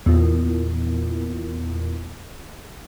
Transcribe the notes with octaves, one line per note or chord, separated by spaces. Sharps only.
E2 A#2